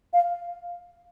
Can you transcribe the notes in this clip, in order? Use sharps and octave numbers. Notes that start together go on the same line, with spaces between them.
F5